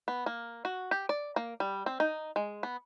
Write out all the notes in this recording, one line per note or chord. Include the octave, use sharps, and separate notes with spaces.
B3
A#3
F#4
G4
D5
A#3
G3
C4
D#4
G#3
B3